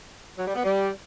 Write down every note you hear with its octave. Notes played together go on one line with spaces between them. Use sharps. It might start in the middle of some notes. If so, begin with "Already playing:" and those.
F#3
G3
B3
G3